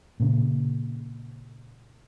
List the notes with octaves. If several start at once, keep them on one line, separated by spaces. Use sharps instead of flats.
A#2 C#3